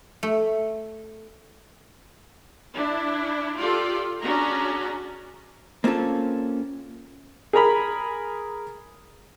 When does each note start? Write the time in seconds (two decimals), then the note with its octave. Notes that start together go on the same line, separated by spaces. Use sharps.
0.23 A3
2.73 D4 E4
3.58 F4 G4 A4 D5
4.21 C#4 D4 F#4 G#4 A#5
5.84 A#3 C4 C#4 F4 A4
7.53 G#4 A#4 A#5 B5